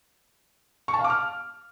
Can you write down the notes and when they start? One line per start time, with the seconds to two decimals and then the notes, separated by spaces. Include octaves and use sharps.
0.88 C#6
0.94 A5
0.99 F5
1.04 D6
1.10 F6